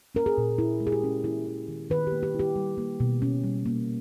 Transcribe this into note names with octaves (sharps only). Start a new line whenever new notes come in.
C#4 A#4
G#4
A#2
E4
G#3
G#4
G4
C#4
A#3 E4
E4
D#3
D#3 B4
G4
A#3
G4
E4
G4
G3
A#3
B2
C#4
G3
A#3